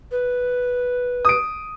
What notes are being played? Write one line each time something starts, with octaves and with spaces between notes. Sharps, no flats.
B4
D#6 D7